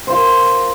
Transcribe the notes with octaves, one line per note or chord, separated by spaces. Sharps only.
F4 A#4 C5